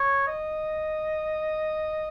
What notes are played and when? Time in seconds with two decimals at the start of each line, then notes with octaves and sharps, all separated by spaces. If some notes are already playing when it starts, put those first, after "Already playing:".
Already playing: C#5
0.28 D#5